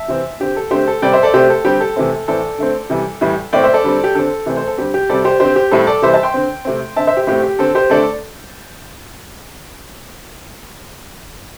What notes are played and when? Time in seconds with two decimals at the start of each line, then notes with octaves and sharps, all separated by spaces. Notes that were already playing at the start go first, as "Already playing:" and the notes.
Already playing: E5 A5
0.08 C3 E3 C4
0.40 D3 C4 G4
0.56 A4
0.71 D3 A3 C4 G4 C5
0.88 A4
1.02 C3 G3 C4 D5 G5
1.13 C5 E5
1.23 A4 D5
1.34 C3 A3 C4 G4 C5
1.50 A4
1.65 D3 G3 C4 G4
1.81 A4
1.96 C3 E3 A3 C4
2.28 A2 E3 C4 A4 D5
2.58 D3 A3 C4
2.90 C3 E3 G3
3.21 A2 E3 G3
3.53 A2 A3 C4 D5 G5
3.64 C5 E5
3.74 A4 D5
3.84 D3 G3 C4
4.04 G4
4.15 D3 C4 A4
4.46 C3 E3 A3 C4
4.57 C5
4.67 A4
4.77 D3 G3 C4 G4
4.94 G4
5.09 C3 G3 C4 A4 D5
5.25 G4 C5
5.40 D3 C4 G4 C5
5.56 G4
5.71 A2 G3 C4 A4
5.87 A4 D5
6.02 C3 E3 G3 C5 E5
6.13 E5 A5
6.23 G5 C6
6.34 D3 C4
6.65 C3 A3 C4
6.96 D3 C4 E5 A5
7.07 C5 E5
7.17 G4
7.27 A2 A3 C4 G4
7.43 G4
7.59 D3 C4 A4
7.75 G4 C5
7.90 D3 A3 C4 A4 D5